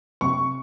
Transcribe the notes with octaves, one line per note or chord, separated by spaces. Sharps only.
C3 C#6